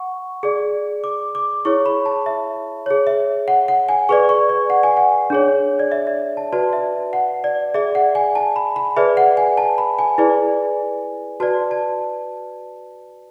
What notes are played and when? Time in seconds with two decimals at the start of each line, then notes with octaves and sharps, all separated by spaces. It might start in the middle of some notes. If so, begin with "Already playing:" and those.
Already playing: F#5 C#6
0.43 G#4 D5
1.04 D6
1.35 D6
1.65 E4 G#4 C#5 C#6
1.86 B5
2.06 A5
2.26 E5
2.86 G#4 C#5
3.07 E5
3.48 F#5
3.68 F#5
3.89 G#5
4.09 G#4 B4 D5 C#6
4.29 C#6
4.49 D5
4.70 F#5
4.83 G#5
4.97 F#5
5.30 D4 G#4 C#5
5.80 D5
5.92 E5
6.07 E5
6.37 A5
6.53 F#4 B4 D5 A5
6.73 E5
7.13 F#5
7.44 D5
7.74 G#4 D5 E5
7.95 F#5
8.15 G#5
8.35 A5
8.56 B5
8.76 B5
8.97 G#4 B4 D5 E5
9.17 F#5
9.37 G#5
9.57 A5
9.78 B5
9.99 G#5
10.18 E4 G#4 B4 D5
11.40 F#4 B4 D5 A5
11.71 A5